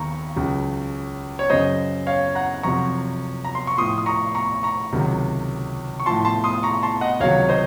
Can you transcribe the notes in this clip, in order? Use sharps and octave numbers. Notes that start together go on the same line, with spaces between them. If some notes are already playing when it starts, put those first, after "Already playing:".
Already playing: D#2 D#3 A#5 C#6
C#2 C#3 F#3
C#5
F#2 C#3 F#3 C5 D#5
C#5 F5
F#5 A#5
F2 C3 F#3 A#5 C#6
A#5
C6
C#6
A2 F3 C6 D#6
D#6
A#5 C#6
A#5 C#6
A#5 C#6
C#2 C3 D#3 F#3
C#6
A2 F3 A5 C6
A5 C6
C6 D#6
A#5 C#6
A5 C6
D#5 F#5
C#2 C3 D#3 F#3 C#5 F5
C5 D#5